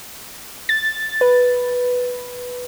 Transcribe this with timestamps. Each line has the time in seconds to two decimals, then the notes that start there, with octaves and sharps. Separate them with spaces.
0.69 A6
1.21 B4